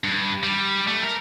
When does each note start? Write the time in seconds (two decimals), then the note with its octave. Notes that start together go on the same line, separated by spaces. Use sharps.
0.04 G2
0.43 G3
0.87 A3
1.03 A#4